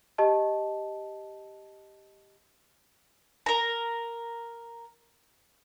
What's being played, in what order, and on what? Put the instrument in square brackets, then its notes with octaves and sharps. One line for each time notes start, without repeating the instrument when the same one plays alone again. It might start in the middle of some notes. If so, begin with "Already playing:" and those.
[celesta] G4 D#5 A5
[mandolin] A#4 A#5